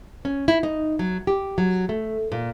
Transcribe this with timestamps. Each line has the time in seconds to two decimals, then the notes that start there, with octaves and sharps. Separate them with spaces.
0.25 C#4
0.48 E4
0.63 D#4
0.99 F#3
1.27 G4
1.58 F#3
1.89 A3
2.32 A#2